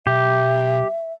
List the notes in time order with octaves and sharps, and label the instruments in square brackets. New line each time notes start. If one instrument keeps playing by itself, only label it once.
[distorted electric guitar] B1 [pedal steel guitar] G4 [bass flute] E5